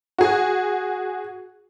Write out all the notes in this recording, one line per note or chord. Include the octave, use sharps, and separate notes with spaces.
F#4 G#4